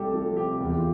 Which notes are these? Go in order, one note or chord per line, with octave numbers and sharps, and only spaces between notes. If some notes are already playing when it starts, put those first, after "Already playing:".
Already playing: C2 A3 G4 A4
F3 A4
C3 G4
E2
G4
F4